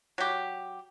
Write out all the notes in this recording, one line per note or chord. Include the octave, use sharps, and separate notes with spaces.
F#3 G4